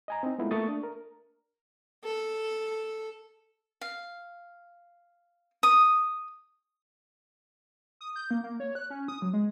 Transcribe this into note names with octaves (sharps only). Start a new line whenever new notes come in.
D#5 G#5 A#5
C4 D#4
G#3 A3 B3 E4 F4
A3 A#3 C#6 D#6 A6
D4
A#4
A4
F5
D#6
D#6
G6
A#3
A#3
C#5
F#6
C#4
D#6
F#3
G#3